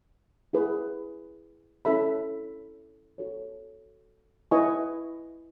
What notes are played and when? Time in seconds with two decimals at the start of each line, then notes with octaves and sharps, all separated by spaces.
0.53 E4 G#4 B4
1.85 C#4 E4 A4 E5 B5
3.18 F#4 A4 C#5
4.51 E4 B4 D#5 G#5 C#6